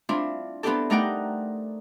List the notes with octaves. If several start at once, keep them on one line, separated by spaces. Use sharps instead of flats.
C4 D4 E4 F4
B3 C4 D4 E4 G4 A4
A3 D#4 A#4 D5 F#5 G5